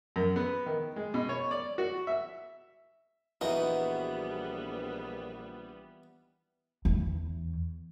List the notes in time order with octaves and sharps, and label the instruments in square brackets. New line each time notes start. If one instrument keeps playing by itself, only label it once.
[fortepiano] F#2
B3
D#3
G#3
B2
C#5
D5
F#4
E5
[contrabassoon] A#1 [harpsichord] E3 D#4 [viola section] G3 B3 [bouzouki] F#4 G#4 F#5
[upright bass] E2